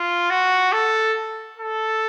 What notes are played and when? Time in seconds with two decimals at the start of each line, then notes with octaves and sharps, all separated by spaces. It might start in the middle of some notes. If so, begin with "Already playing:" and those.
Already playing: F4
0.30 F#4
0.72 A4
1.57 A4